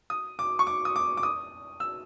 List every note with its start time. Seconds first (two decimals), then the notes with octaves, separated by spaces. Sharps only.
0.10 D#6
0.39 D6
0.59 C#6
0.67 D6
0.85 D#6
0.96 D6
1.17 D6
1.23 D#6
1.80 E6